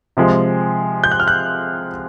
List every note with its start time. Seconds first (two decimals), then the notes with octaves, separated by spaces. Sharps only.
0.17 C3 F3 G#3
1.04 G6
1.11 F#6
1.20 F6
1.28 F#6